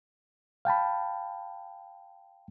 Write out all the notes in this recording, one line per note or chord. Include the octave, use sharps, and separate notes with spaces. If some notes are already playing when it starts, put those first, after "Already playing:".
F5 G5 A5 B5